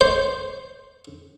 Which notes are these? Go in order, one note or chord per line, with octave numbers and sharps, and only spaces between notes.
C5